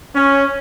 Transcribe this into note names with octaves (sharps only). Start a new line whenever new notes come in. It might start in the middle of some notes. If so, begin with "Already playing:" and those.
C#4